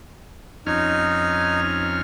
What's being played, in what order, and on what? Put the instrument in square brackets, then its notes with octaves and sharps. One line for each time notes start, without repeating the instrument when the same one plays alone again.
[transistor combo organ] F2 C#4 F6 [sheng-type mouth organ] D#4